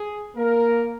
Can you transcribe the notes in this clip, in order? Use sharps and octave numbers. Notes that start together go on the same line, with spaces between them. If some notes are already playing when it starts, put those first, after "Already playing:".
Already playing: G#4
A#3 A#4